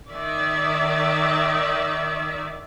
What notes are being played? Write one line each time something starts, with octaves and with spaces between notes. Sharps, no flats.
D#3 D5 E5